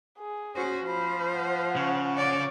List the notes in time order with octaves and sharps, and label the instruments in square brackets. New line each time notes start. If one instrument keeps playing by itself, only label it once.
[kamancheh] G#4
[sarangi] C#4 [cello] F#4 C5
[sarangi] F3 [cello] C5 [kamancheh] B5
[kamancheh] F#5
[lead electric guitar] C#3
[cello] C#5 D5